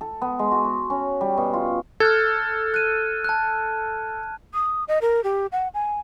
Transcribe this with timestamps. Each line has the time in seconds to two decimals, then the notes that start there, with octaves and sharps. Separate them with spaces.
0.01 A4
0.22 B3
0.39 G#3
0.51 F#4
0.65 C6
0.90 C#4
1.21 G3
1.37 B2
1.53 F4
2.00 A4 F6 F#6 G#6
2.74 F#6 D#7
3.24 A5 F#6
4.54 D#6
4.88 D#5
5.01 A#4
5.24 G4
5.52 F#5
5.74 G#5